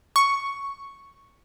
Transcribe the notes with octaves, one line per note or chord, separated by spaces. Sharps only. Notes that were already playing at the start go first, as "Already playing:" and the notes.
C#6